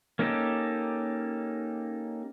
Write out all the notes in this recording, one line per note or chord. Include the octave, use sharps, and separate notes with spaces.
A#3 C#4 D#4 G4 A4